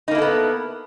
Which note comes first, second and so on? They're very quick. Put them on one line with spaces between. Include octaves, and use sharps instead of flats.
D#4 A#3 E4 A4 B3